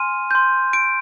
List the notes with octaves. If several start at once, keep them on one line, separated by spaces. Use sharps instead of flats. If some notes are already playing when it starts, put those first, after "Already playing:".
Already playing: G#5 C6 F6 D#7
C6 G6
D7